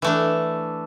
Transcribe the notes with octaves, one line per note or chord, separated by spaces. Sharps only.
E3 A3 D4